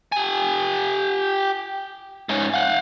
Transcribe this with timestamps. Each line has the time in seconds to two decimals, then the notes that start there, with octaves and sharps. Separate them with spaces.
0.12 G4 G#5
2.29 G#2 C#4
2.54 F5 F#5